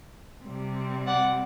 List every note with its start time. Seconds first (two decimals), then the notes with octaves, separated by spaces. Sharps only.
0.45 C3 G3 C4
1.06 D5 F#5